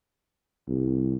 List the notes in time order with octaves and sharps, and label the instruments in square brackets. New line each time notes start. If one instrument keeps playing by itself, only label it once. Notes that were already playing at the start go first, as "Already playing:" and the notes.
[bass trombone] C2